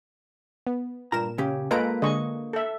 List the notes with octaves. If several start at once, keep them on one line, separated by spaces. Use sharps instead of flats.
B3
G2 A#2 A#4 A#5 E7
C#3 C#4 G4
G#3 A#3 F4 A4 B4 A#5 D7
D3 G#3 D#5 C#6
A4 E5